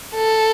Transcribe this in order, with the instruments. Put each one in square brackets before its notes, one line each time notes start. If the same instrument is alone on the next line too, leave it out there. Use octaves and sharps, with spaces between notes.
[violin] A4